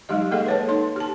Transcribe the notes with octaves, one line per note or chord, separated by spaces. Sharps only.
F#3 G#3 D#4 G4 D#5
G#3 A#3 G#4 A4 D#5 F#5
B4 C#5 A5
D#4 C6
G4 A5